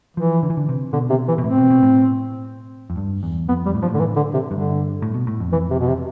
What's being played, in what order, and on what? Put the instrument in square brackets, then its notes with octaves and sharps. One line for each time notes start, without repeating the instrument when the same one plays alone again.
[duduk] E3 [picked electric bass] F3
[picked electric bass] D3
E3
D3
C3
[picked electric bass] B2 [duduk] D3
[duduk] C3
E3
[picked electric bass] B2
[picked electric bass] A2 [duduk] C4
[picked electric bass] B2
B2
A2
F2
G2
E2
[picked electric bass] F2 [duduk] B3
[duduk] G3
[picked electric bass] A2
[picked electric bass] G2 [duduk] F3
[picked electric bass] A2 [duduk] D3
[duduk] E3
D3
C3
[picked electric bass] G2 [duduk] D3
[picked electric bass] A2
B2
A2
F2
[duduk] E3
C3
B2
C3